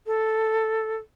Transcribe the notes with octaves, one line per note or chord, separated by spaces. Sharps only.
A4